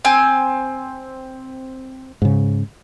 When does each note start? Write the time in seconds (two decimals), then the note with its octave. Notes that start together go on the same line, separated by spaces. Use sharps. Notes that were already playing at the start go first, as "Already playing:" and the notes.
0.05 C4 G#5
2.22 G#2 C#3